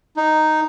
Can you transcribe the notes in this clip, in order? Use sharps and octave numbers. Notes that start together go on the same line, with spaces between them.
D#4